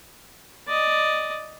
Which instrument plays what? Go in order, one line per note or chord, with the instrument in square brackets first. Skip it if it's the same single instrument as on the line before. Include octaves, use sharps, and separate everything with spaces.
[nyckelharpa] D5 D#5